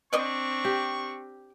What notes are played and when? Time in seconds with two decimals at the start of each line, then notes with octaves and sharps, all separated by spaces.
0.13 C4 D4 D5 D#5 C#6
0.65 G4